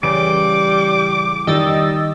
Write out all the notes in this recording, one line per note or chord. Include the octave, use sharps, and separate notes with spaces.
C#3 E3 G3 D6 D7
D#3 G3 D#5 E6 A6